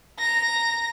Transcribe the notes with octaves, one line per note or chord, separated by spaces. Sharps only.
A#5 A#6